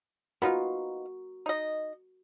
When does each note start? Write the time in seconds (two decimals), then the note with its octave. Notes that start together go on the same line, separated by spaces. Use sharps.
0.42 B3 D#4 F4 F#4 A#4
1.46 D#4 D#5